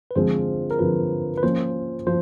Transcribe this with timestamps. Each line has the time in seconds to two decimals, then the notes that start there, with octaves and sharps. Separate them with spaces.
0.11 B4
0.16 D3 F3 G#3 C4 F4 C5
0.71 A#4
0.79 D3 F3 G#3 C4 F4 B4
1.37 B4
1.43 F3 A#3 C#4 F4 A#4 C5
2.07 F3 C5